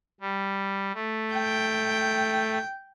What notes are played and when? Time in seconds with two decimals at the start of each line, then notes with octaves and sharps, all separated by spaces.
0.21 G3
0.94 A3
1.34 G5